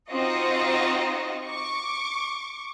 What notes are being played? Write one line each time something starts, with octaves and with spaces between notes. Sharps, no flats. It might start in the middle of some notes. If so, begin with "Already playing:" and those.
C4 D#4 F4 F#4 D#5 C#6
C#6 D6